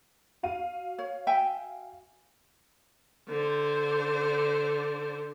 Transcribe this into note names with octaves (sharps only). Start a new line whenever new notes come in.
F#4 F5 D#7
C#5
E5 G5 G#5
D3 C5